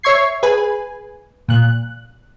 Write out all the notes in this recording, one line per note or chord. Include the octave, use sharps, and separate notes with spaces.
C#5 E5 C#6 G#6 C7
G#4 B4 G#5
A#2 F#6